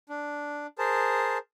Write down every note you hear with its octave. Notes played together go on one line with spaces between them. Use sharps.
D4
G#4 A#4 C5 A5